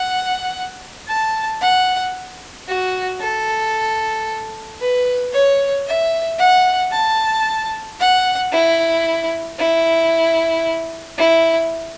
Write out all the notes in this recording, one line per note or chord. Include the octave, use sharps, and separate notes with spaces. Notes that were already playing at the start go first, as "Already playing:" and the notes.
Already playing: F#5
A5
F#5
F#4
A4
B4
C#5
E5
F#5
A5
F#5
E4
E4
E4